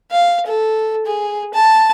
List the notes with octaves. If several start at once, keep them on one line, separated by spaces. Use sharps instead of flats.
F5
A4
G#4
A5